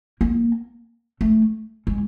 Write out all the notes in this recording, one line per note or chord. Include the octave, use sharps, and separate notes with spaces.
A#3
A3
G#3